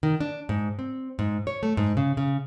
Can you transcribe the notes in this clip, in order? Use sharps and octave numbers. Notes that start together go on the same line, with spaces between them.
D#3
D4
G#2
C4
G#2
C#5
A3
G#2
C#3
C#3